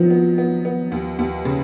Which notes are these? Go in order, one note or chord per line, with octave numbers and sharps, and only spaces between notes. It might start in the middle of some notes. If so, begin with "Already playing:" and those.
Already playing: D#3 F3 F#3 B3
B3
B3
B3
D#2
D#2
C#3